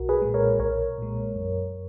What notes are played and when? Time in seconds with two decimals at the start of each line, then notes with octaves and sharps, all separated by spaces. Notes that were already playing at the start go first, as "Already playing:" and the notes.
Already playing: B1 F#4 A#4
0.09 G#4 B4
0.22 A#2 G#3
0.34 A#4 C#5
0.59 B1 A#4 C#5
0.98 A#2 G#3
1.36 F#2